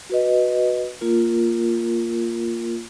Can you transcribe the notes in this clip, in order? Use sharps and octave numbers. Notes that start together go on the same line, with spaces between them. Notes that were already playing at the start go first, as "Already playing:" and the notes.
F#4 B4 D#5
A#3 F4 A#4